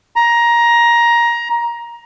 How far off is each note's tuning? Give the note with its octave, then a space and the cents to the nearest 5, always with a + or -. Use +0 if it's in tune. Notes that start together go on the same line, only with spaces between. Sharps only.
A#5 +15